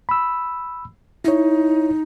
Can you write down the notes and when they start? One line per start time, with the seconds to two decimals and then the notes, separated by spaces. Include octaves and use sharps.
0.09 B5 E6
1.24 D#4 E4 C#5